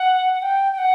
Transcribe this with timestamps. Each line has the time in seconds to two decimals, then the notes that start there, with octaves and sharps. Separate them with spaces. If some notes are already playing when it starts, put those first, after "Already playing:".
Already playing: F#5
0.33 F#5
0.42 G5
0.73 G5
0.78 F#5